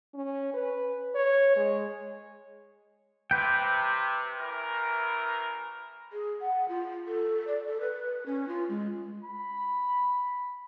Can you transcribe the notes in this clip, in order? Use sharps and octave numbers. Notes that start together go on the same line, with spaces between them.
C#4
B4
C#5
G#3
C3 B4 G5
A1 E3 A#4
G#4
F#5
F4
A4
D5
A4
B4
C#4
F4
G#3
B5